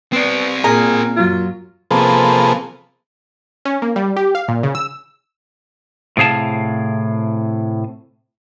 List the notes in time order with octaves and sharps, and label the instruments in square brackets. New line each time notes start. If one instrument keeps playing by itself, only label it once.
[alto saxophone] B3 [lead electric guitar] C4 D5
[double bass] A#2 [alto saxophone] G#4 [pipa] A#4
[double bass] F#2 F#3 [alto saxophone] F4
[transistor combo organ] C3 F3 A#3 B3 G#4 A4
[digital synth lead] C#4
A#3
G3
G4
F5
A#2
C#3
E6
[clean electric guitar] A2 C3 G#4 F5 A5